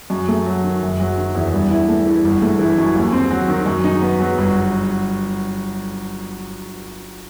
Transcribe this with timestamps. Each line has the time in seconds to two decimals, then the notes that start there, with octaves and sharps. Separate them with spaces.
0.10 F#2
0.28 A3
0.46 F#3
0.64 D#3
0.82 F#1
1.00 F#3
1.18 D#3
1.35 E2
1.53 G2
1.70 E4
1.88 A3
2.07 E3
2.25 G1
2.42 A3
2.59 E3
2.78 F#2
2.95 D#2
3.13 C4
3.31 F#3
3.48 D#3
3.66 F#2
3.84 D#4
4.02 B3
4.20 F#3
4.38 G1